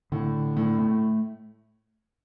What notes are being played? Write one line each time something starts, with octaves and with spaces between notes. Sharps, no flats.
A2 D3
A2 A3
A2